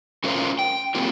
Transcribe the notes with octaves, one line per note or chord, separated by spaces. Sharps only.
A3 C#4 F4 A#4 C5 F5
G5
A#3 C4 F4 G4 A#4